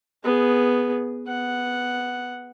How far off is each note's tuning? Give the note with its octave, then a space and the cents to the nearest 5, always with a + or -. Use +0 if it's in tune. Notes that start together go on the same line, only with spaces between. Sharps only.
B3 +0 G#4 +0
B3 +0 F#5 +0